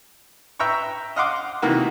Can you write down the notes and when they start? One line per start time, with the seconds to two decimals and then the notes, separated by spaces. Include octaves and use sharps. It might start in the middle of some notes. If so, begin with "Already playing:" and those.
0.60 B4 E5 G5 A#5 C#6
1.16 D#5 F5 F#5 C6 D6
1.62 C3 D#3 E3 A#3 D#4 F#4